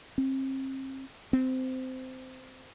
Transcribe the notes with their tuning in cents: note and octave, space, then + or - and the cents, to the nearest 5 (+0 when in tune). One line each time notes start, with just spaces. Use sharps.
C4 +35
C4 -15